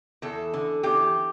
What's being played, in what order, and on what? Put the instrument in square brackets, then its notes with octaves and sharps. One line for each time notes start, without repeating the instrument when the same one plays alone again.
[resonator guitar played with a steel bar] E2 A4
D3
E2 G4